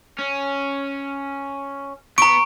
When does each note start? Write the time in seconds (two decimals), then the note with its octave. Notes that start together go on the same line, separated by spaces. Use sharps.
0.19 C#4
2.18 B3 A#5 C#6 D7